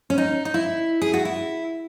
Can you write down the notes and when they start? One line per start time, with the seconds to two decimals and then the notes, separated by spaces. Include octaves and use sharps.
0.10 C#4
0.18 D#4
0.45 D#4
0.54 E4
1.02 G#4
1.14 F#4
1.25 E4